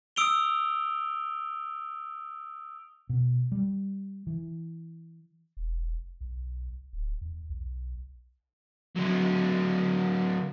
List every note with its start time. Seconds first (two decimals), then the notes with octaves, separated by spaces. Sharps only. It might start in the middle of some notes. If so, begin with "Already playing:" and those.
0.16 D#6 E6 D7 F7 G7
3.09 B2
3.52 G3
4.27 E3
5.57 E1
6.21 B1
6.93 D1
7.21 E2
7.49 B1
8.96 D3 F#3